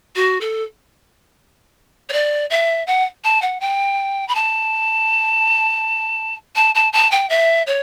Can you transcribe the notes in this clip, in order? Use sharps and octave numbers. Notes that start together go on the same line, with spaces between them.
F#4
A4
C#5
D5
E5
F#5
A5
F#5
G5
B5
A5
A5
A5
A5
G5
E5
C#5